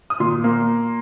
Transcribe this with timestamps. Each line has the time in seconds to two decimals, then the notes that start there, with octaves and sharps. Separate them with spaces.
0.10 D#6
0.20 A#2 C6
0.44 A#3